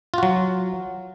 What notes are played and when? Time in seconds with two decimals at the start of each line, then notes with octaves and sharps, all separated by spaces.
0.14 F4
0.18 F#4
0.23 F#3